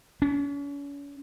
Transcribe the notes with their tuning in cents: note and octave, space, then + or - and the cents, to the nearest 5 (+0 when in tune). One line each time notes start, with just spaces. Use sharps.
C#4 +40